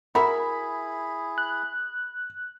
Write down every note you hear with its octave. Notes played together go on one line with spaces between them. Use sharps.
E4 F#4 G#4 A#4 E5 B5
F#6